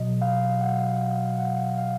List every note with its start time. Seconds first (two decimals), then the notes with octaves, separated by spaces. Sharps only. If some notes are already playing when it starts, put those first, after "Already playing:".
Already playing: B2 F#3 D#5
0.21 F5
0.61 F#5
1.39 F#5
1.78 F5